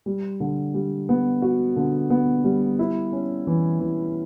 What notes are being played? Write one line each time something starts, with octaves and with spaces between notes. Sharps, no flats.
G3
D3
G3
B3
F#4
D3
B3
G3
E4
C#4
E3
E3